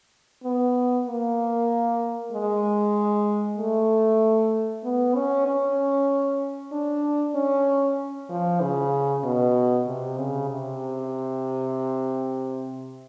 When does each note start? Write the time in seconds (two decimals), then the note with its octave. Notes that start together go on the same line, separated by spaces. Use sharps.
0.44 B3
1.07 A#3
2.32 G#3
3.58 A3
4.84 B3
5.16 C#4
5.47 C#4
6.72 D4
7.35 C#4
8.30 F3
8.61 C#3
9.24 B2
9.87 C3
10.19 C#3
10.50 C3